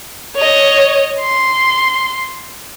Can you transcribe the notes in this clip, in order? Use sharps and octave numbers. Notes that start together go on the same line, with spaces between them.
C#5 D#5
C6